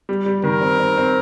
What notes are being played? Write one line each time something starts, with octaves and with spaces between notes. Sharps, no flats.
G3
G3
D#3 A#4
C4
C4
C4